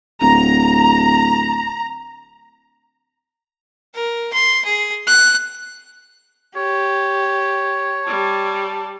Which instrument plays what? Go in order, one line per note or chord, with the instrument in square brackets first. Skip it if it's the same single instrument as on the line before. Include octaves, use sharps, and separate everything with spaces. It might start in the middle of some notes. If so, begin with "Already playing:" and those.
[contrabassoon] D1 [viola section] A#5
[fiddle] A#4
C6
G#4
F#6
[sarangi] G4 [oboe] C#5
[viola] G3 [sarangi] A5